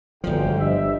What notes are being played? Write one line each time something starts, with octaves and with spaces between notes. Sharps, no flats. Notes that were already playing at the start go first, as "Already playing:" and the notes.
G1 D2 G#2 F3 G5
G2 D#5 E5